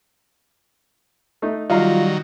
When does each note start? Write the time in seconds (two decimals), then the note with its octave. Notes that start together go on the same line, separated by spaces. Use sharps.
1.42 A3 D#4
1.70 D#3 F#3 G3 F4 D#5 F5 A#5